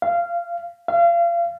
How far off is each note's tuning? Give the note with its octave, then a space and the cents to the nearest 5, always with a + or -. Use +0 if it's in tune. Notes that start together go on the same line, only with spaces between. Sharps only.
F5 -20
F5 -35